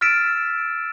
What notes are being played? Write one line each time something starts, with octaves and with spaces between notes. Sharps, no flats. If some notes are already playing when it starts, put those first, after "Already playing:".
E6 F6 A6 B6 D7 E7